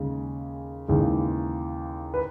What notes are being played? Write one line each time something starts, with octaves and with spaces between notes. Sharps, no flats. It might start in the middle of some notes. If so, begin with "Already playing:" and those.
Already playing: D#2 C#3 G#3
D#2 C#3 E3 G#3
B4